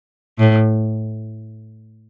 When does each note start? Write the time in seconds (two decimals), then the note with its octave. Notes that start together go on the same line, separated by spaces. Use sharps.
0.39 A2